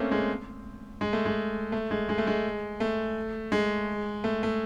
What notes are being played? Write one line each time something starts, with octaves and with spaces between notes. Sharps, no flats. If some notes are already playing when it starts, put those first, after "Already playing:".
Already playing: A3 A#3 C4 C#4
G#3
G#3
A3
G#3
A3
G#3
G#3
A3
G#3
A3
G#3
A3
A3